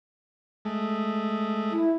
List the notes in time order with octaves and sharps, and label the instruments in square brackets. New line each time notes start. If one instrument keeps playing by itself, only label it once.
[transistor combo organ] G#3 A3
[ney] E4